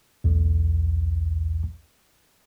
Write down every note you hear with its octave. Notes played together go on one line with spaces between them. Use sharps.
B1 E2